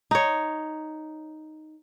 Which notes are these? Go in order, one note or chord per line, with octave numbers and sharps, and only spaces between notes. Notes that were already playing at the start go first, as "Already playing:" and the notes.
D#4 C#5